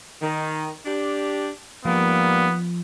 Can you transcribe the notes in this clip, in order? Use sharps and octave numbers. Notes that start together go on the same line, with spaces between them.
D#3
D4 G4
G#2 F3 G3 A#3 B3